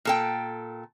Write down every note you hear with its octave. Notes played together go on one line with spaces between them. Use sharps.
A#2 A4 G5